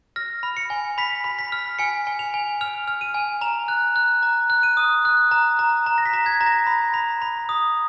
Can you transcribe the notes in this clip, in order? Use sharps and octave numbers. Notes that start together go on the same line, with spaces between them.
F6 A#6
B5
C#7
G#5
B5 B6
B5
B6
F6
G#5 C#7
G#5
F7
G#5
F6 F7
F6
D#7
G#5
A#5 F7
F#6
F#6
A#5
F#6
D#7
D#6
F#6
A#5
A#5
A#5
A#6
B6
A#5
G#6
A#5
A#6
B5
B5
B5
D#6